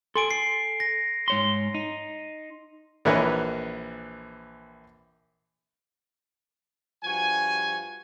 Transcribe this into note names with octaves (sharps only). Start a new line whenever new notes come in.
A4 G#5 C6 D7
C7
A#6
G#2 C#5 C6
D#4
A#1 E3 A#4 B4 C#5 D#5
G2 F3 F#4 G#5